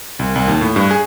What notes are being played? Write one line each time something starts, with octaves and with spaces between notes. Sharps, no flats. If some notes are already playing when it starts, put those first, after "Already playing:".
C2
C2
D#2
A2
G2
G#4